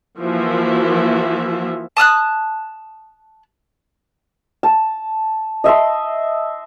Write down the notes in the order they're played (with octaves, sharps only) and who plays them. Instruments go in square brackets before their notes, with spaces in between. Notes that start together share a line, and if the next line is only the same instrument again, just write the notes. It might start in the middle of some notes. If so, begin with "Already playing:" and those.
[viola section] E3 F3 A#3 F#4 E5
[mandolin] A5 D#6 F6 F#6
[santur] A5
D#5 E5 A5 C6